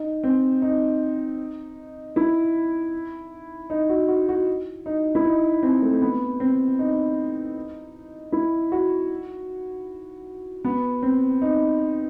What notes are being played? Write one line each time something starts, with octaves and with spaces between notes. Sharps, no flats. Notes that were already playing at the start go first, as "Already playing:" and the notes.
Already playing: D#4
C4
D#4
E4
D#4
F#4
F#4
F#4
D#4
E4
D#4
C4
A3
B3
C4
D#4
E4
F#4
B3
C4
D#4